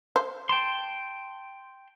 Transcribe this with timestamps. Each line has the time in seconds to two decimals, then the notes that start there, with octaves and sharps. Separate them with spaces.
0.16 C5
0.49 G5 A5 C6